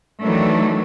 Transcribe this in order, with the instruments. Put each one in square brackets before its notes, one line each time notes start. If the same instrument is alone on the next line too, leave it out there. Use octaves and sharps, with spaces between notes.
[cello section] D#3 E3 F#3 A3 D4